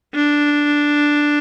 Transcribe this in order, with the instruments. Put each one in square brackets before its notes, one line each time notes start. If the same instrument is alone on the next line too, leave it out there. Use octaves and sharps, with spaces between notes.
[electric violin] D4